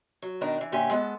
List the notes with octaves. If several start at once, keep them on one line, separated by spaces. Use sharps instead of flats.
F#3
B2 D#3 D4 D#4 A#4
E3
A#2 D3 C#4 G4 E5 G#5
G#3 B3 A4